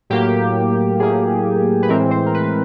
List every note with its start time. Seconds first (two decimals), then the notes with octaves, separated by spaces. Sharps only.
0.10 A2 F#3 A#3 G4
1.00 A2 F#3 A#3 G#4
1.82 B4
1.89 A2 E3 G#3 C4 A#4
2.11 C5
2.26 A#4
2.34 B4